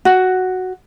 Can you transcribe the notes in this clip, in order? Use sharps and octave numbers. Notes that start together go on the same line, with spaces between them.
F#4